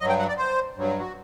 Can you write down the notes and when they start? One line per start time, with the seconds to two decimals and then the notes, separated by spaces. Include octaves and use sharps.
0.01 G2 F#3 D#5
0.09 G5
0.19 F#5
0.28 D5
0.37 C5
0.75 G2 F#3
0.99 F#4